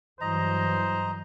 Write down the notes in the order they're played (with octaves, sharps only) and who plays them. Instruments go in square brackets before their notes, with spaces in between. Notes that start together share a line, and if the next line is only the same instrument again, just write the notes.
[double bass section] G2 E3 F#3 [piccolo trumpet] C5 [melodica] D#5 A#5